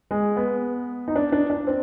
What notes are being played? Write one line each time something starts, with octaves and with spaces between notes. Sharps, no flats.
G#3
B3
D#4
D4
D4
D4
C4